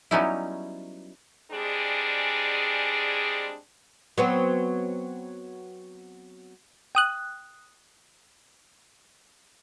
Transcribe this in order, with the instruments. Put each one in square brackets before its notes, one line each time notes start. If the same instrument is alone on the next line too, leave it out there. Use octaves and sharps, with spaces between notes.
[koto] F#3 G3 B3 C#4 D#4 E4
[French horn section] G3 G#3 C4 D4 G#4
[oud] F#3 B3 C4
[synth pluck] G5 D#6 F#6